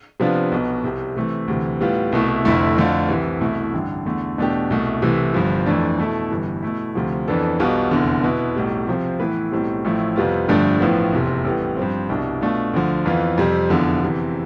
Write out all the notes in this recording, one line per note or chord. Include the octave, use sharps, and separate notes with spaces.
C3 F3 B3 D4 F4
B1 B2 B3
C2 C3 G3
C3 E3 A3
D2 C3 E3
A2 G3 B3 F4
C2 B2 A3 E4
F1 F2 D3 A3 E4
F2 D3 A3 D4 F4
C2 C3 E3
C2 B2 A3 E4
A1 G2 D3
E2 D3 A3
E2 B2 A3 D4 G4
C2 B2 A3
C2 C3 E3 A3
G1 G2 F3
F2 E3 A3 D4
B2 A3 E4 A4
G1 G2 E3
B2 A3 E4
D2 C3 F3
F2 E3 B3 D4 A4
B1 B2 G3 B3 F4
F1 E2 D3
B2 B3 E4
B1 A2 G3
C3 F3 C4
A2 E3 B3 E4 B4
B1 A2 G3 C4
A1 A2 F3 A3 E4
F2 C3 G3 B3 F4
G1 G2 F3 A3 D4
A1 A2 F3 B3
F1 E2 C3
A1 A2 G3 B3
G2 F3 C4
C2 B2 G3 D4
B2 A3 D4 F4
D2 D3 F3
F2 E3 B3 F4
F2 C3 G3
F1 E2 D3 F3
E2 C3 E3